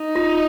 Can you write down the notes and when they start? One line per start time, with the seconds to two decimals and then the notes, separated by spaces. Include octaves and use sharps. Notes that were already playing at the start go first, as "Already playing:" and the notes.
Already playing: D#4
0.16 F4